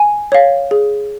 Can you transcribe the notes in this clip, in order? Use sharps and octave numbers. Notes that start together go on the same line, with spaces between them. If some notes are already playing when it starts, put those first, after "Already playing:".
Already playing: G#5
C#5 F5
G#4